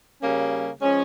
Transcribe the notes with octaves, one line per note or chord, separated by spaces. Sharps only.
C#3 G3 A#3 C#4
F3 G#3 C#4